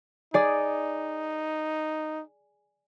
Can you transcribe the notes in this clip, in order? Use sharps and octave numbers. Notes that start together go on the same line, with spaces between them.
D#4 G#4 D5